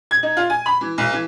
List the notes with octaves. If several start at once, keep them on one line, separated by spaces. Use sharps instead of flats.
G#6
D#4
F4
G#5
B5
E3
B1
E3